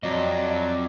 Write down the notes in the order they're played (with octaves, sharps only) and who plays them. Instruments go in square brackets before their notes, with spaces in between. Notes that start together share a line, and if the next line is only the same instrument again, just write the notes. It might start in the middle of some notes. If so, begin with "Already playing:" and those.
[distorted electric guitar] F2 [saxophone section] F#3 [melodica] D5 [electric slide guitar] D#5